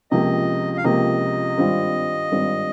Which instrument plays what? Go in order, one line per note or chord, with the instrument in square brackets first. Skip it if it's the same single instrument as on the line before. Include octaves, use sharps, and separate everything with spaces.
[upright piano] C#2 C3 F3 A#3 [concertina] D#5
[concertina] F5
[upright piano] C#2 C3 F3 A#3 [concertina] D#5
[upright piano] G#1 G2 G3 C4 F4
G#1 G2 G3 C4 F4